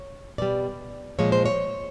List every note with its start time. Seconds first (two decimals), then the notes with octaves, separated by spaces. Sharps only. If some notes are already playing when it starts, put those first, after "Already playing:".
Already playing: C#5
0.38 B2 G3 D5
1.19 A#2 F3 G#3 C#5
1.32 C5
1.46 C#5